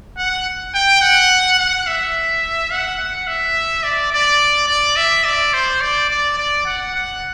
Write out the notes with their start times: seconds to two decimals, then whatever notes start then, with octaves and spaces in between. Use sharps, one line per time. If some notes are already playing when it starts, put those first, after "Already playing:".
0.17 F#5
0.74 G5
1.02 F#5
1.59 F#5
1.87 E5
2.71 F#5
2.99 F#5
3.27 E5
3.83 D5
4.12 D5
4.68 D5
4.96 E5
5.25 D5
5.53 C5
5.81 D5
6.10 D5
6.38 D5
6.66 F#5
6.94 F#5